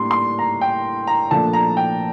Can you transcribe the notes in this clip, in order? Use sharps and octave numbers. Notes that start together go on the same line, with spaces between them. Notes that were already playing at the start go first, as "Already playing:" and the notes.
Already playing: A2 G3 A#3 D4 C6
C6
A#5
G5
A#5
A#2 F3 A3 D4 A5
A#5
G5